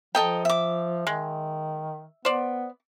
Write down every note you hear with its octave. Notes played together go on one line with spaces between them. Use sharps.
F3 A4 D#5 G5 A#5
E5 D6
D#3 G#3
B3 C5 D5